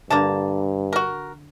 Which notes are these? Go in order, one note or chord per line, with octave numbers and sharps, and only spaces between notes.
G2 D3 A#3 A5 A#5
F#4 A#4